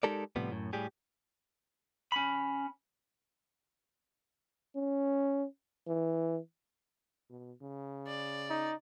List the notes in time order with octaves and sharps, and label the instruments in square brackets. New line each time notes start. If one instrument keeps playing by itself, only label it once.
[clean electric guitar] G#3 D#4 G4 A4 A#4 D5
A2 C3 F3 G3 B3
F#2 A2
A2 G3 G4 G#4
[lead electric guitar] C#4 B5
[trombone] C#4
E3
[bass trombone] B2
C#3
[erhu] D5
[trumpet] D#4